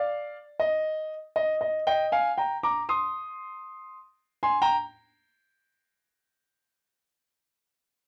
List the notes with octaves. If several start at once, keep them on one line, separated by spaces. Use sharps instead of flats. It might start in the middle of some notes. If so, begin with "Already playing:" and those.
Already playing: D5 F5
D#5
D#5
D#5
D#5 G5
F5 G#5
G5 A#5
A#5 D6
C6 D#6
G#5 C6
G5 A#5